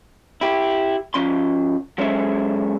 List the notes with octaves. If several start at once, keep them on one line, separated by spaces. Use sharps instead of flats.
E4 G4
F3 C#4 C6
F#3 G#3 C#4 A4 C5 E5